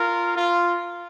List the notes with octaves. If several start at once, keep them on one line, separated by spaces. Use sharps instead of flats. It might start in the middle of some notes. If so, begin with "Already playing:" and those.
Already playing: F4 A#4
F4